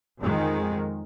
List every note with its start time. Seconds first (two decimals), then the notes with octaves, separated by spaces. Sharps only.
0.19 F2 D#3 G#3